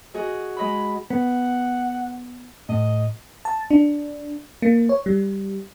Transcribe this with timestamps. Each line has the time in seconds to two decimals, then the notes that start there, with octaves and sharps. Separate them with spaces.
0.14 F#4 G#4 D#5
0.57 G#3 D#5 B5
1.10 B3 F#5
2.69 A2 D#5
3.45 A5
3.71 D4
4.62 A#3
4.89 C#5
5.06 G3